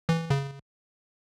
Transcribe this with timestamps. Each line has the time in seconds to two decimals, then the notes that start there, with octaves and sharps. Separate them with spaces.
0.09 E3
0.30 C#3